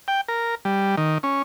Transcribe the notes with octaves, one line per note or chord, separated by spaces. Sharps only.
G5
A#4
G3
D#3
C#4